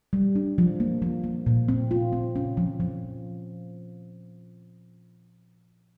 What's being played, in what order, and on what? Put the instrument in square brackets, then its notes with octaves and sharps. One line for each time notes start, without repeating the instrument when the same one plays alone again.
[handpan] G3
D4
F3
A#3
F3
A#3
A#2
C4
F4
C4
C#4
F3
F3